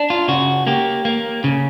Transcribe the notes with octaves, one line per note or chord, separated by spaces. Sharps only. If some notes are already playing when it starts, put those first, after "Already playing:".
Already playing: D4
F4
C#3 F#4
A#3 G4
A#3
C#3